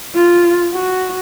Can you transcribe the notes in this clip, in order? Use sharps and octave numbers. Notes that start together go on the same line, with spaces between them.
F4
F#4